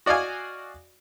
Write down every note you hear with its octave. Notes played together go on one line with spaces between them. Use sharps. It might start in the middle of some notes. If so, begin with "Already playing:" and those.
F#4 D5 D#5 F5 G#5